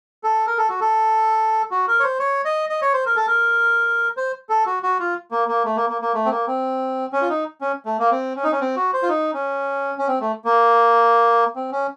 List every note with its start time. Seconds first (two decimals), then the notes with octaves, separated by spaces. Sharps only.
0.24 A4
0.47 A#4
0.58 A4
0.69 F#4
0.81 A4
1.71 F#4
1.88 A#4
2.00 C#5
2.04 C5
2.19 C#5
2.45 D#5
2.69 D#5
2.82 C#5
2.94 C5
3.06 A#4
3.16 A4
3.27 A#4
4.17 C5
4.49 A4
4.66 F#4
4.83 F#4
4.99 F4
5.31 A#3
5.48 A#3
5.65 A3
5.76 A#3
5.90 A#3
6.02 A#3
6.15 A3
6.26 C4
6.31 A#3
6.47 C4
7.13 C#4
7.22 F4
7.29 D#4
7.61 C#4
7.86 A3
7.99 A#3
8.11 C4
8.36 C#4
8.44 D#4
8.52 C#4
8.61 C4
8.76 F#4
8.93 C5
9.03 F4
9.09 D#4
9.34 C#4
9.98 C#4
10.08 C4
10.21 A3
10.45 A#3
11.56 C4
11.72 C#4